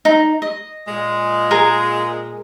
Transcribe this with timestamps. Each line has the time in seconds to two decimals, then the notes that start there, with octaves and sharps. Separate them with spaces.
0.05 D#4
0.42 D#5
0.88 A#2 G#3
1.51 G#4 A#4 D#5